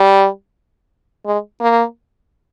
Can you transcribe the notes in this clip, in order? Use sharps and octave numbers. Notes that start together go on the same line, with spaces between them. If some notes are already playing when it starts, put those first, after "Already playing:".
Already playing: G3
G#3
A#3